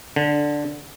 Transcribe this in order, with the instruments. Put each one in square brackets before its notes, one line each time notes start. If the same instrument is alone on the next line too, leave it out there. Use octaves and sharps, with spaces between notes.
[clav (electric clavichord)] D3